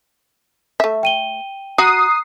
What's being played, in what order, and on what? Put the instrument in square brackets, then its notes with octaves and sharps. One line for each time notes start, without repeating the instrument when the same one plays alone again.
[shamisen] A3 E5
[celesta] G5 D#7 G7
[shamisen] F#4 [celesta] A#5 F#6 [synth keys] D#6 C7